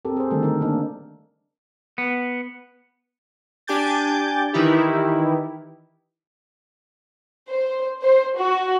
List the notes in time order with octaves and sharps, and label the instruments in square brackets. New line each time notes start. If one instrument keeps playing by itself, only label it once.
[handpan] C4 G4 A4 A#4
G#4 C5
D3 D#3 G3 A3 A4
D#4 A#4
A#3 D4 D#4
[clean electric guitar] B3
[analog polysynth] D4 G4 G#5 D6 G6 A6
D#3 E3 D#4 E4 G4
[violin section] C5
C5
F#4